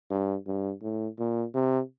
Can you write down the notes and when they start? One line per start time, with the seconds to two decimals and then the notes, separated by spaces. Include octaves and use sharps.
0.10 G2
0.47 G2
0.82 A2
1.19 A#2
1.54 C3